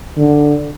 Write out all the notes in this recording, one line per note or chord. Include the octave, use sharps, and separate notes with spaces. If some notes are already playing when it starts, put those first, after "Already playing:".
D3